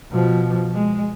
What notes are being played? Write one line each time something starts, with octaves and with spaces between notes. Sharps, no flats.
B2 F3
G#3